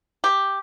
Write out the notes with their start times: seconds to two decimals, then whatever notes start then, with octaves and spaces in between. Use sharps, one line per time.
0.24 G4